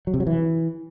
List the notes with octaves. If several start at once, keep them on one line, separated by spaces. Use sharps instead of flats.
F#3
C3
F#3
E3